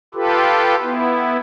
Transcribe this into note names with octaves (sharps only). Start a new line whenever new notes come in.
F4 G4 A4 B4
B3 E4